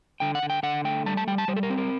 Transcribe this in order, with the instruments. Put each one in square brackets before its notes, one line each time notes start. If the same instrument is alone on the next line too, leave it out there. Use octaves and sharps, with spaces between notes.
[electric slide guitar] D3 G5
F#5
D3
G5
D3 F#5
A3 G5
G3 A5
A5
G3 G5
A5
G3 C5
A4
A#4
C4
A#4